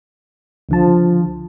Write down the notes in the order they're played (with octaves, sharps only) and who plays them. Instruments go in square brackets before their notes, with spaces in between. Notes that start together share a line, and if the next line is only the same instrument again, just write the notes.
[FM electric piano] C#2 D3 A5 [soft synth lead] F3